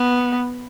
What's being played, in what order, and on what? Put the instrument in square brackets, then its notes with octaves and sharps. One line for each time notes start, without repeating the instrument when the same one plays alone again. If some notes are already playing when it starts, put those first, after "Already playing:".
Already playing: [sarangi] B3